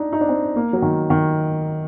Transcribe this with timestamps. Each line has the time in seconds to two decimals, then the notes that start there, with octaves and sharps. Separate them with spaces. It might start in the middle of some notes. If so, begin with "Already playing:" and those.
Already playing: D4 D#4
0.13 D#4
0.21 D4
0.29 C4
0.56 A#3
0.73 F#3
0.82 D#3
1.10 D#3